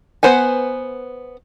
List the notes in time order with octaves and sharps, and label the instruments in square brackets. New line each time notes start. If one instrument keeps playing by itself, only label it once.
[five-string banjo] B3 B4 C5 F#5 G#5